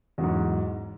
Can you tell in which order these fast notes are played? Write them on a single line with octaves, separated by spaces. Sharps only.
E2 F#3 G#2